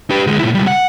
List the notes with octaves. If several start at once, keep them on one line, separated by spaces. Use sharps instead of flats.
G4 B4
D2 G#3
A#2 E4
C#2 G3
F#5